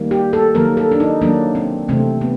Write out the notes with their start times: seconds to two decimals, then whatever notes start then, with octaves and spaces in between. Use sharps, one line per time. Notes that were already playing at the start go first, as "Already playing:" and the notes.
Already playing: D#3 G3 A#3
0.11 G4
0.33 A4
0.55 D#3 F#3 A#3 A#4
0.77 A4
0.92 D4
1.00 D#4
1.21 D#3 F#3 A#3 D4
1.55 C4
1.89 C3 E3 A3 C4
2.21 B3